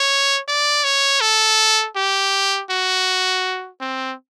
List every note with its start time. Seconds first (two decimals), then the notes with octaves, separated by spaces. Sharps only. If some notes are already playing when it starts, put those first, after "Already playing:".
Already playing: C#5
0.48 D5
0.84 C#5
1.21 A4
1.96 G4
2.70 F#4
3.81 C4